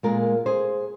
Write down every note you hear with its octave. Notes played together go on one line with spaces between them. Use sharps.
A#2 G#3 F4 A#4
G#4 C5